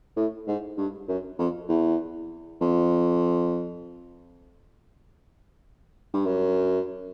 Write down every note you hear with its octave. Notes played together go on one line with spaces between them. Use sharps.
A2
G#2
G2
F#2
F2
E2
F2
G2
F#2